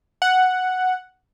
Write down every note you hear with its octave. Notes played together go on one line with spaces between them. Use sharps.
F#5